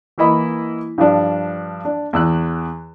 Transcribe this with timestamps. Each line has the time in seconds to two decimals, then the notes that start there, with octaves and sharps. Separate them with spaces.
0.18 E3 A#3 E4 D#5 B5
0.98 G2 F3 D4
1.85 D4
2.13 E2 E6 F#6